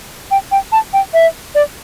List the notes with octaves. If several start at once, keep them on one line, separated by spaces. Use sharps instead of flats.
G5
G5
A5
G5
E5
D5